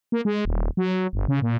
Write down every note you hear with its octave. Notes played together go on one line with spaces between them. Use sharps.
A#3
G#3
D#1
F#3
G1
C#3
A#2